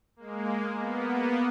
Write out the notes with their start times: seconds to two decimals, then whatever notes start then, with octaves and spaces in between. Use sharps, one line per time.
0.16 G#3 A#3
0.77 A#3 B3